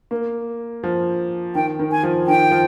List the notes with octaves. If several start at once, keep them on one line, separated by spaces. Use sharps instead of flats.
A#3
F3
D#3 G5
D#3
G#5
F3
D#3 G5
F3